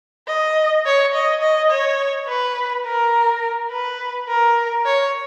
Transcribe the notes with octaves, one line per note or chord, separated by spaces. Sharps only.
D#5
C#5
D#5
D#5
C#5
B4
A#4
B4
A#4
C#5